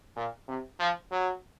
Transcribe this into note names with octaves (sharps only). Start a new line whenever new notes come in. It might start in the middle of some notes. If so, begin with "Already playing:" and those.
A#2
C3
F3
F#3